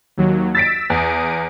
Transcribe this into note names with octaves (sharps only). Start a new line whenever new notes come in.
D#2 F#3
E6 A6 B6 D7
E2 D#6 D7